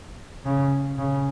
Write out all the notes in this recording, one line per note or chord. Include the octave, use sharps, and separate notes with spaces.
C#3
C#3